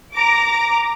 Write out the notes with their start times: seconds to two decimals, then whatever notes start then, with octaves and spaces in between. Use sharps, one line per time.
0.13 A#5 D6